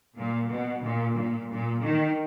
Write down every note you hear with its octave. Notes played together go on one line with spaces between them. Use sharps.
A#2
B2
A#2
A#2
A#2
D#3